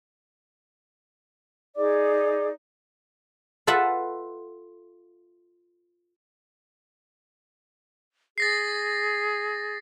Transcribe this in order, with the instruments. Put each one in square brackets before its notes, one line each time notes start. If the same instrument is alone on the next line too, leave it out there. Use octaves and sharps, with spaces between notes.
[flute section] D#4 G#4 D5 D6
[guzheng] F4 A4 B4 E5 F#5
[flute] G#4 [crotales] A6 A#6 C7